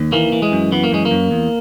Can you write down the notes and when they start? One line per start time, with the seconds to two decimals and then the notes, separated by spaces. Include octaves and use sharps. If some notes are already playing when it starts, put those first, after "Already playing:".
Already playing: D#2
0.12 E3 A#3
0.32 E3
0.42 G#3
0.52 F#2
0.72 E3 B3
0.84 A#3
0.92 F#2 G#3
1.05 A#3
1.11 F#2
1.31 E2